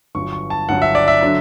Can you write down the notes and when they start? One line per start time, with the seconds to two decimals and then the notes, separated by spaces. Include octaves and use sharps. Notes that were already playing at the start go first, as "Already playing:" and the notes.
0.15 G1 G2 F#3 C#6
0.32 C#6
0.50 A5
0.68 G1 G2 F#3 F#5
0.82 E5
0.95 D5
1.08 E5
1.21 D3 F#3